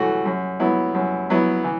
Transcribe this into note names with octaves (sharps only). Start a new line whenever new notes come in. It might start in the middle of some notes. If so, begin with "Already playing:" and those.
Already playing: F#2 E3 A3 F#4
F#2
F#3 B3 E4
F#2
F#3 B3 E4
E3